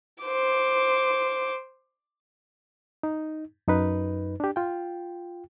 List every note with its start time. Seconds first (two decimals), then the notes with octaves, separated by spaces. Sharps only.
0.24 C5 D6
3.03 D#4
3.68 F#2 D#4 B4
4.40 D4 G4
4.56 F4 G5